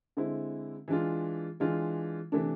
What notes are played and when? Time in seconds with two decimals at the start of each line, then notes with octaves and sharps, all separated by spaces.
0.17 D3 G#3 C4 E4
0.88 E3 G#3 D4 F4
1.60 E3 G#3 D4 F4
2.32 C3 E3 A3 D4